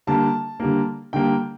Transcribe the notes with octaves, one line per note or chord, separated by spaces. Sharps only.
D3 G3 A#3 A5
D3 G3 A#3
D3 G3 A#3 G5